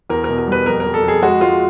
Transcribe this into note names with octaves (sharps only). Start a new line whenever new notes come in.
E2 A#4
B2 A#4
A#4
G3 B4
F2 A#4
F2 A#4
A4
F2 G#4
G#3 F#4
G#3 F4